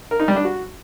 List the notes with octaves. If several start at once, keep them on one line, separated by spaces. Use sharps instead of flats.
A#4
D#4
G3
D4
F#4